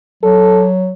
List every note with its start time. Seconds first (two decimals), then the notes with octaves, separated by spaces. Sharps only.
0.23 F#3 A4